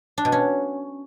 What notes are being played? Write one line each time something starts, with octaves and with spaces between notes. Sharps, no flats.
D4
B2
C#4